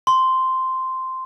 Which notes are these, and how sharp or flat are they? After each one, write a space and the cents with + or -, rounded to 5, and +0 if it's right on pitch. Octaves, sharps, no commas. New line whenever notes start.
C6 -5